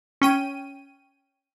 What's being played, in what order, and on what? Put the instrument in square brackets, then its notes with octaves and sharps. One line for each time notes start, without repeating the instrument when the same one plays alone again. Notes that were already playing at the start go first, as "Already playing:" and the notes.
[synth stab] C#4 G5 D#7